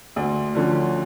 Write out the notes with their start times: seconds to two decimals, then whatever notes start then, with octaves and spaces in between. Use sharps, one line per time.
0.16 D2
0.55 D3 F3 C#4